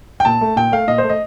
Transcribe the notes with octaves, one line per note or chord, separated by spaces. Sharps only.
G5
A#2 A5
A3
A#2 G5
A3 F5
A#2 D#5
C5
A3
D#5